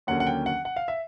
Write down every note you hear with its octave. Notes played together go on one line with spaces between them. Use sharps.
D#2 D3 F#3 A#3 C#4 F#5
F#5
G5
F#5
F#5
F5
E5